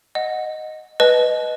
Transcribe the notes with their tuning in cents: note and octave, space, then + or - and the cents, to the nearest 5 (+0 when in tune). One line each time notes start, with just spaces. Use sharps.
D#5 +0 F#5 -10
B4 +0 D#5 +0 A5 -40